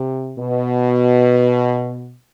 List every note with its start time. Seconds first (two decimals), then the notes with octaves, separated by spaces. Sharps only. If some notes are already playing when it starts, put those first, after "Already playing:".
Already playing: C3
0.38 B2